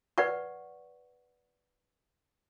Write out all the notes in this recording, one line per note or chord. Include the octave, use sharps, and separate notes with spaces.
B4 D5 F#5 C#6